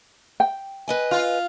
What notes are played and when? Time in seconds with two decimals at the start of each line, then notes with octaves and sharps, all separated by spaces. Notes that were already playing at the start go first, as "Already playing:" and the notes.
0.40 G5
0.88 B4 D#5 G#5
1.11 F4